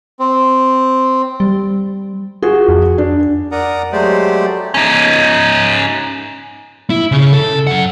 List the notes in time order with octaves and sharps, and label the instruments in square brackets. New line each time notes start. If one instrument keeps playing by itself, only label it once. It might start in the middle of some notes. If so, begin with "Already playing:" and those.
[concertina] C4
[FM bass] G3
[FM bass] F4 [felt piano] F#4 G#4
[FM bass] F2
[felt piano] D4
[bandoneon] A#4 D5 F#5 A#5 D#6
F#3 G#3 A3 G4 C5 D5
[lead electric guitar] C#4 D#4
E4
C#3
A4
F#2 F#5